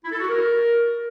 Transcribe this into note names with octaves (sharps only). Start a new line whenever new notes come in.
E4
A4
F#4
A#4